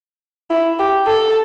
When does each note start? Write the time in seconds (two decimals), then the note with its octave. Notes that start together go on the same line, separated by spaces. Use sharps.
0.50 E4
0.79 G4
1.07 A4